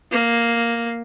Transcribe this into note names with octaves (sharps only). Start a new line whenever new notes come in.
A#3